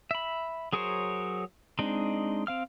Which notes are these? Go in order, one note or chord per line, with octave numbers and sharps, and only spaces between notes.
E5 B5
F#3 G#4 A#4 C5 C#5
G#3 C4 D4 D#4
C4 F5 F6